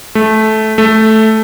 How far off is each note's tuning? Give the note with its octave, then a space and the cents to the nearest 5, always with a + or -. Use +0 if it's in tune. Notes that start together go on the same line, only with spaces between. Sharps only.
A3 -15
A3 -5